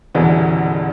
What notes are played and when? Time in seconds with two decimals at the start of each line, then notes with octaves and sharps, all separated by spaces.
0.14 D#1 E2 B2 D3 E3 B4